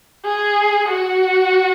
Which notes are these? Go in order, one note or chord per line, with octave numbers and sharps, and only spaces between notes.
G#4
F#4